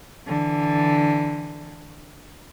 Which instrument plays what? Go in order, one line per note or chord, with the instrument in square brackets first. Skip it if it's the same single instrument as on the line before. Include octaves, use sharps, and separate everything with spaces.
[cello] D3 E3